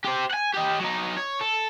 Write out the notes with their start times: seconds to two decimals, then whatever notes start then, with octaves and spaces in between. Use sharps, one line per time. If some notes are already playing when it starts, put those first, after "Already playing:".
0.05 G4 C5
0.31 F#5 G#5
0.53 G4 D#5
0.79 F#3 D#4
1.17 C#5
1.41 A4